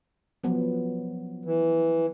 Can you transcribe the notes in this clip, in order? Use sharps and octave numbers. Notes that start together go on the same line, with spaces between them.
F3 F#3 B3
E3